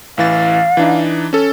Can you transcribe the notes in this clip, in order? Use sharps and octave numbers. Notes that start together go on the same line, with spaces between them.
A1 E3 F5 A6
E3 D4 D#4
C#4 A4